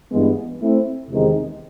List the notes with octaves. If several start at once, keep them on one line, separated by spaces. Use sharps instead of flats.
G2 E3 G#3 B3
A3 C4 E4
E2 C3 D#3 G#3